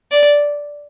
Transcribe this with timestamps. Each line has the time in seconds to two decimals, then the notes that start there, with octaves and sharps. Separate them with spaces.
0.11 D5